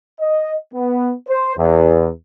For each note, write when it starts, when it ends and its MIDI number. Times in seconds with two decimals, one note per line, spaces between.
0.20 0.53 75
0.74 1.12 59
1.28 1.52 72
1.56 2.08 40